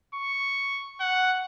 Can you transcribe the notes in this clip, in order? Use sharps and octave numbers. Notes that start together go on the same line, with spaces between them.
C#6
F#5